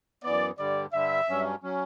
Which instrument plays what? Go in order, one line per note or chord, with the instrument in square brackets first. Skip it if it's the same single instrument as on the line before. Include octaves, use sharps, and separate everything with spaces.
[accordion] F#2 E3 B3 [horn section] D5
[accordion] G2 D3 G3 [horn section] D5
[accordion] G2 D3 G3 [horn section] E5
[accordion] G2 F#3 C#4
F#3 C#4